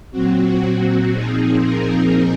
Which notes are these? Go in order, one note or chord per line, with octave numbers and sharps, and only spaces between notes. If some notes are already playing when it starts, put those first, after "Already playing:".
A#2 F#3 C4 F#4
A#2 F3 C4 D#4 G#4
A#4